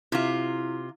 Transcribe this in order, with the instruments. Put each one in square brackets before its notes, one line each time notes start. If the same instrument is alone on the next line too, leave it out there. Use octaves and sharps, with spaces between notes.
[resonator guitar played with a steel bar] C3 F4 [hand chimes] E4